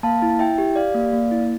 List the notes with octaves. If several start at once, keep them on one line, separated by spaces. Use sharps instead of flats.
A#3 F5 A5
E4
E4 E5 G5
G4
G4 D5 F5
A#3
A#3
E4